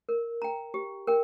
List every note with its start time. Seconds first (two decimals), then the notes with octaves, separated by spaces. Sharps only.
0.09 A#4
0.42 G5 A#5
0.74 G4
1.07 A#4 G5